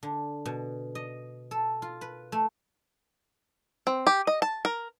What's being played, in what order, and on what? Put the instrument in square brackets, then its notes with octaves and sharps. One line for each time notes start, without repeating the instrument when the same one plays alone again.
[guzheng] D3
B2
D#5
A4
F4
B4
A3
[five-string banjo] C4
G4
D#5
A5
A#4